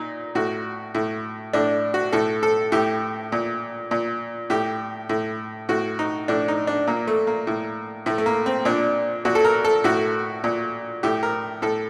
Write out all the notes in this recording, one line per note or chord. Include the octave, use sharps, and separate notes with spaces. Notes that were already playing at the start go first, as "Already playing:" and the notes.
Already playing: A#2 D#4
A2 F#4
A2
A2 D4
F#4
A2 A4
A4
A2 G4
A#2
A#2
A2 G4
A2
A2 F#4
D#4
A2 D4
D#4
D4
A#2 A#3
A3
A#3
A2
A2 A3
A3
A#3
C4
A#2 D4
A#2 F#4
A4
A#4
A4
A2 F#4
A#2
A2 G4
A#4
A2 A4